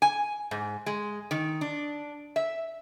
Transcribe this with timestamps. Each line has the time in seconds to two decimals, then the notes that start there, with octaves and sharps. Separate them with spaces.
0.02 G#5
0.51 G#2
0.86 G#3
1.31 D#3
1.61 D4
2.36 E5